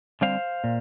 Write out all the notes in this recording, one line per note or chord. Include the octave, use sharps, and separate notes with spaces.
D3 G3 C4 C5 F5
A#2